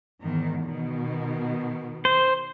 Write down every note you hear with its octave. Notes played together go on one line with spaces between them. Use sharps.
E2 G#2 D#3
B2 D#3
C5